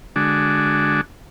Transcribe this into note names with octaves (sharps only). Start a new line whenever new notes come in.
D3 G#3 D4 F#4